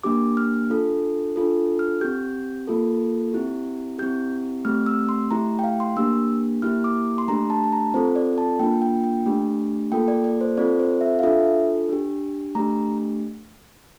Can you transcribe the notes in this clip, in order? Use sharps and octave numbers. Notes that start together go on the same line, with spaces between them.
A#3 D4 G4 D6
F6
D4 F4 A4
D4 F4 A4
F6
C4 G4 G6
A#3 F4 A4
C4 E4 G4
C4 E4 G4 G6
A3 C4 G4 F6
E6
C6
A3 E4 G4 A#5
G5
F5
C6
A#3 D4 G4 E6
A#3 E4 G4 F6
D6
C6
A3 D4 G4 A#5
A5
A5
A#5
C4 F4 A4 C5
D5
A5
A#3 D4 F4 G5
G5
G5
A3 D4 G4
A#3 F4 A4 G5
D5
D5
C5
C4 F4 A4 D5
C5
E5
F5
D4 F4 A4 E5
D4 G4
A3 D4 G4 A#5